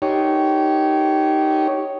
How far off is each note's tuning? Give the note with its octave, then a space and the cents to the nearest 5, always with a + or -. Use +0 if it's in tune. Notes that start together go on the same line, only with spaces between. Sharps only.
D#4 +0 G4 -20 C#5 +0